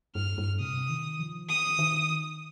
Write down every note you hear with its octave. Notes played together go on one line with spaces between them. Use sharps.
G2 F6
G2
C3 D#6
D#3
F3
D#3 D#6
D#3